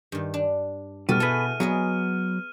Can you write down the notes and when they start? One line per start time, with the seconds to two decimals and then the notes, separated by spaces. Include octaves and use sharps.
0.12 G2 D#3
0.34 D4
1.09 B2 G3 A4 F6 D#7
1.20 E4 G#4 A4 B4
1.60 F#3 B3 G#4 B4 D#5